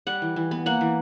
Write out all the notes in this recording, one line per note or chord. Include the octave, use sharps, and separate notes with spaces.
G3 F#5
E3
E3
B3
A#3 F#5
E3